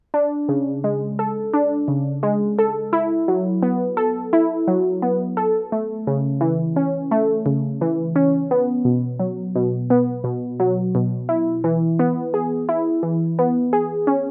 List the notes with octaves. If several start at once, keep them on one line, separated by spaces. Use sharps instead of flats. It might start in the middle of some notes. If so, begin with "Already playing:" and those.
D4
C#3
G#3
A4
D4
C#3
G#3
A4
E4
F#3
B3
A4
E4
F#3
B3
A4
A3
C#3
E3
C#4
A3
C#3
E3
C#4
B3
B2
F#3
B2
B3
B2
F#3
B2
E4
E3
B3
G#4
E4
E3
B3
G#4
C#4